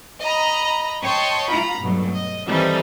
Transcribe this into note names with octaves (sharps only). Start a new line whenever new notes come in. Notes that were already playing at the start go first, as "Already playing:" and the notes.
D#5 A#5 B5
C#5 D#5 G5 A5 C6 C#6
F4 A#5 B5
G2 B2 F#3 A3
D#5
D#3 E3 G3 C4 D#4 A4